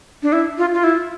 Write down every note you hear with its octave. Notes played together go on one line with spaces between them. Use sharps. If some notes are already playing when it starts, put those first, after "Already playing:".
D4
E4
F4
F4
E4